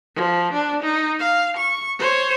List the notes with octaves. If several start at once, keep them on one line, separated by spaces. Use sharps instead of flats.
F3
D4
D#4
F5
C#6
C5 C#5